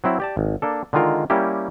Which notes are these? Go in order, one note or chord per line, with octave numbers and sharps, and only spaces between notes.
F#3 C4 E4
G4 D5 A5
G#1
A#3 D4 A4
D3 D#3 G#3 F4 A#4
G3 A#3 C#4 E4 G4